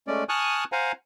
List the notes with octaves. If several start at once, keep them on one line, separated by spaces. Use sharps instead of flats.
G#3 A3 C#4 D5
G#5 A5 C#6 D#6 F6 F#6
C5 F5 F#5 G#5 A#5